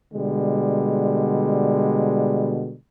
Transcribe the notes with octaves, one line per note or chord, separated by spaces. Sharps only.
B2 D3 G3 G#3